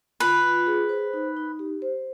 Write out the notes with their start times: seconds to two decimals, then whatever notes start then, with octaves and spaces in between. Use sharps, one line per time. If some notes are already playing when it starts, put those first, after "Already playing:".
0.20 F4 B4
0.43 F4
0.67 G#4
0.89 C5
1.13 D#4
1.37 D#4
1.59 G4
1.82 C5